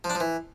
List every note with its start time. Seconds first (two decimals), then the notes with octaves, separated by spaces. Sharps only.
0.04 F3
0.10 D4
0.15 F3
0.20 E3